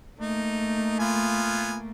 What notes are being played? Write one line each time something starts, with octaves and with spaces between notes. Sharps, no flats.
A3 A#3 D#4
B3 F4 G#5